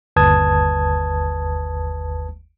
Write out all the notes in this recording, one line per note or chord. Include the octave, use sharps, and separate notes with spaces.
G1 D#2 B4 A5 D#6 G#6